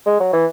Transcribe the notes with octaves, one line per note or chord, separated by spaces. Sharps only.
G#3
F#3
E3